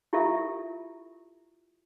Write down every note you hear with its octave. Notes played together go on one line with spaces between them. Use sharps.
E4 F4 G4 A4 A#4 E5